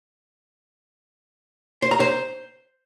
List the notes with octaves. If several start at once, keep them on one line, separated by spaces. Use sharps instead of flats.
C5
A#5
C5